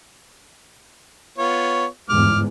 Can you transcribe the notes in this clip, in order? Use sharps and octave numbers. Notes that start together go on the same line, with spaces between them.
B3 F4 C#5
G1 E2 G#2 D6 F6